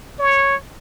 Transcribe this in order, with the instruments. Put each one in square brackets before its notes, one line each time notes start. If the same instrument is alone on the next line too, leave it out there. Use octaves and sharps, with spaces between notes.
[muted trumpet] C#5